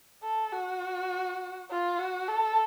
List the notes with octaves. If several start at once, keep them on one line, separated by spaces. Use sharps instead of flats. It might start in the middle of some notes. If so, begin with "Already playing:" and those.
A4
F#4
F4
F#4
A4